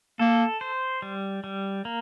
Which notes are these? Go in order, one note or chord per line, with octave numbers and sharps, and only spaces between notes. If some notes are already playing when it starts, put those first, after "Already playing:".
A#3 A4
C5
G3
G3
A#3